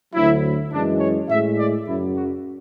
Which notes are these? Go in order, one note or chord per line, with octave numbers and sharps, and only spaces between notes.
D2 D3 F#3 E4
F#2 E3 G#3 D4
C#5
A2 G#3 E5
D5
F#2 C#3 F#3 E4
F#4